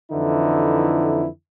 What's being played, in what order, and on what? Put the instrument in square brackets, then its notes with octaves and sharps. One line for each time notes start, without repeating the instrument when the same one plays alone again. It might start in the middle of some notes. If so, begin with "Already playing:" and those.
[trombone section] F2 D3 E3 D#4 E4